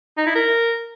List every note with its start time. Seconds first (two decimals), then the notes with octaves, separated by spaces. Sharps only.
0.17 D#4
0.26 E4
0.35 A#4